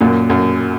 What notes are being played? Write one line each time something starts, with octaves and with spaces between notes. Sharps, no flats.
F#2 A#2
F#2